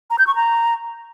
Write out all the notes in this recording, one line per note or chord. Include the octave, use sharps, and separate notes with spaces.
A#5
G6
C#6
A#5